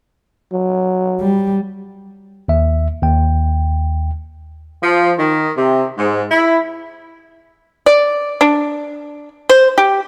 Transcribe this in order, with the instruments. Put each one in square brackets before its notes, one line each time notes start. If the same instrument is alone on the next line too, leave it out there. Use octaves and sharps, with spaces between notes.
[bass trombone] F#3
[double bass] G3
[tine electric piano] D#2 E5
D#2 G5
[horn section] F3
D#3
C3
G#2
E4
[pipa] D5
D4
C5
G4